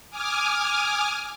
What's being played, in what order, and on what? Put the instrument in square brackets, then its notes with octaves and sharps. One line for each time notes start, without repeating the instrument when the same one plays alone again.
[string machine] G#5 D6 D#6 F6